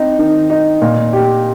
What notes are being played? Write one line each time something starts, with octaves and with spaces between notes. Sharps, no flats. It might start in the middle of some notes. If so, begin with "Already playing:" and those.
Already playing: C4 D#4
D#3
D#4
A#2
G4